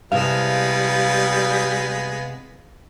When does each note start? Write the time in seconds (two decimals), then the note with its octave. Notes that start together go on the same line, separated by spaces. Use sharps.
0.12 C3 G3 G#3 B3 E4 F5 A5